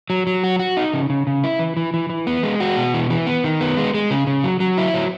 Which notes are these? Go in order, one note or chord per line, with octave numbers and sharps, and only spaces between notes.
F#3
F#3
F#4
F#4
D#4
C#3
C#3
C#3
E4
E3
E3
E3
E3
B3
G#3
F#4
B2
E3
E3
B3
D#3
B3
G#3
G#3
C#3
C#3
F#3
F#3
E4
F#3